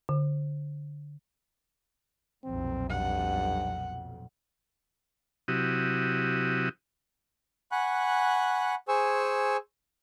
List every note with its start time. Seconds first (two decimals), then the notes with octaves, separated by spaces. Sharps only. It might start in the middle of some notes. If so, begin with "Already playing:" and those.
0.09 D3
2.44 B1 F2 A#2 C4
2.90 G2 F#5
5.48 C3 F#3 E4 F#4 G4 D#6
7.72 F#5 G#5 B5 C#6 F#6
8.88 G#4 C5 G#5 C#6 E6